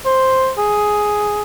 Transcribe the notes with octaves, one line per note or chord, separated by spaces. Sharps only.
C5
G#4